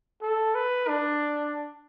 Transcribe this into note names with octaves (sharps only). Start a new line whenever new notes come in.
A4
B4
D4